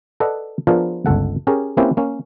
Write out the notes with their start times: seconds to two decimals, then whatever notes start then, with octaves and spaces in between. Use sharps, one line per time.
0.20 A4 B4 D5 D#5 F#5
0.67 F3 B3 D4 F4 G#4 A#4
1.06 G1 C#2 A4 F#5
1.47 C#4 G4 G#4 A#4
1.77 A#3 C4 C#4 E4 G4 B4
1.97 A#3 C#4